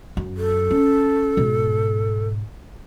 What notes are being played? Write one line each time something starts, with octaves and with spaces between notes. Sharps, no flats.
F#2
A4
C#4
G#2 B2